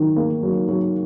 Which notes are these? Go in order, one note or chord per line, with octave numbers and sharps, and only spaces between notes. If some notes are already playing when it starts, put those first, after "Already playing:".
Already playing: D#3 F#3
A#3
F#3
F#3